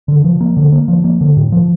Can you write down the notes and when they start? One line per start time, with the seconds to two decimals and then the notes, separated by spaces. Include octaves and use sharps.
0.08 D3
0.24 F3
0.41 A#3
0.57 D3
0.72 A#3
0.88 F3
1.04 A#3
1.21 D3
1.37 A2
1.52 F3